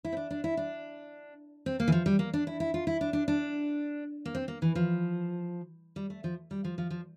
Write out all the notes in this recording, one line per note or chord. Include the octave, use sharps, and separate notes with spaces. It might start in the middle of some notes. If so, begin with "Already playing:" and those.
E4
C4
D4
D4
E4
D4
C4
A#3
E3
F3
G3
A#3
D4
E4
E4
F4
E4
D4
D4
D4
A#3
C4
A#3
E3
F3
G3
A3
F3
G3
F3
F3
F3